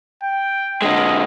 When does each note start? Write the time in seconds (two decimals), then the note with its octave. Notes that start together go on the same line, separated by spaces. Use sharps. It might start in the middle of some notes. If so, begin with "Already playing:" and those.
0.23 G5
0.82 D3 G#3 D#5